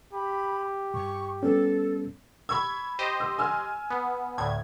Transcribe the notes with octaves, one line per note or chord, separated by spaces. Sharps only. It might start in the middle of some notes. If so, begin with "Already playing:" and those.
G4 B5
G2 C#6
G3 B3 C#4 A4
B5 C#6 E6 G#6
G4 C5 D#5
E6
G#5 E6 F6
B3
D2 A2 G#6